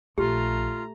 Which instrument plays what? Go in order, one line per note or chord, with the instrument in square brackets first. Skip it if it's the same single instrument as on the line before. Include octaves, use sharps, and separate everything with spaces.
[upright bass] A#1 [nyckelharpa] A3 A#5 [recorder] F4 [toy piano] G4